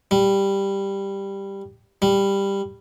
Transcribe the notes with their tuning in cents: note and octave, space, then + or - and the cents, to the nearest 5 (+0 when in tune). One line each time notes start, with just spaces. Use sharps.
G3 +5
G3 +10